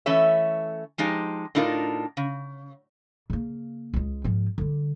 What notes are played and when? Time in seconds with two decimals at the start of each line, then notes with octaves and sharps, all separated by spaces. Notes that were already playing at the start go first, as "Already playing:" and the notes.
0.06 E3 A3 C#4 C#5 E5
0.98 F3 G#3 D#4 G4
1.55 A2 D4 D#4 F4 A#4
2.17 C#3
3.30 C#3 A#3
3.94 C#2 G#3
4.24 G#2 F3
4.58 D3 G3